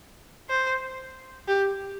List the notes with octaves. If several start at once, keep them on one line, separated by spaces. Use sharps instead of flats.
C5
G4